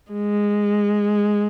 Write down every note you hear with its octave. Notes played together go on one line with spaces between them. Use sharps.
G#3